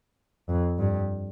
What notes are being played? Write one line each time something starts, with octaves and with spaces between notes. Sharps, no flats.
F2
G2